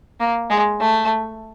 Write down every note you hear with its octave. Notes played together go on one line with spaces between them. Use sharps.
A#3
G#3
A3